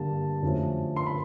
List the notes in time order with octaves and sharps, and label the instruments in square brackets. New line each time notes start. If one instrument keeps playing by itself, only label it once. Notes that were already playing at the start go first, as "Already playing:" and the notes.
Already playing: [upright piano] G2 D3 G3 A#3 D4 A5
F#2 D3 F3 A3 C#4
C6
B5